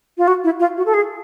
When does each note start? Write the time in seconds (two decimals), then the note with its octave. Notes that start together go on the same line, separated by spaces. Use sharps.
0.18 F4
0.28 F#4
0.44 E4
0.60 F4
0.77 F#4
0.86 A4
0.94 G#4